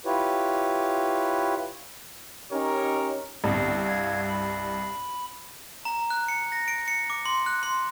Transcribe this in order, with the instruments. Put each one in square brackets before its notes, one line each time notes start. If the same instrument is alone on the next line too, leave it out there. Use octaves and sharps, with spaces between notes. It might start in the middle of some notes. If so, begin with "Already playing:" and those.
[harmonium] E4 F4 G4 B4 C#5
[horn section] C#4 D#4 G4 A#4 C#5
[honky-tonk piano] C2 G2 [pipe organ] D3 B3
[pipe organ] F5 G#6
B5
[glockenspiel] A#5
F#6
C#7
A#6
D7
C#7
D6
C6
F#6
C6